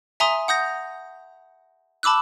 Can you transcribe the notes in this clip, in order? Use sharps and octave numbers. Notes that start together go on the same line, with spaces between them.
E5 G#5 A#5 C6 D#6
F#5 D#6 G6 A#6
A5 B5 D6 E6 F#6